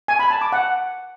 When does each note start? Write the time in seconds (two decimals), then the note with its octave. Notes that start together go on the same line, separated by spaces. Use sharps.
0.08 G#5
0.19 B5
0.30 A5
0.41 D6
0.52 F#5